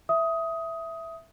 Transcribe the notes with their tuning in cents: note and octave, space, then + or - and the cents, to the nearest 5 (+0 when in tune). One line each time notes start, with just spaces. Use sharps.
E5 +0 D#6 +15